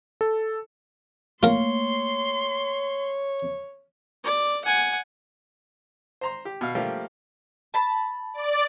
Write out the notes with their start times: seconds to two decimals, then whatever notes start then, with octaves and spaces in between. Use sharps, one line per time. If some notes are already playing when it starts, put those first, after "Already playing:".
0.21 A4
1.43 A3 A#3 F4 A#4 C#5 C6
4.24 D5
4.64 F#5 G#5
6.21 C5 A#5 C6
6.45 G4
6.61 B2 F5
6.75 F3 G3 A3 A#3 F4 G4
7.74 A5 B5
8.33 D5